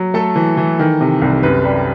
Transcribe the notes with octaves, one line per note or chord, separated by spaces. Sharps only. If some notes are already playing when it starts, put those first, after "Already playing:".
Already playing: F#3
A3 A4
E3
E3
D#3
C3
C2
F#2 B4
G3